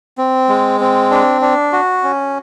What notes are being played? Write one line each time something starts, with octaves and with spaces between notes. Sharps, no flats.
C4
G#3
C4
D4
D4
F#4
C#4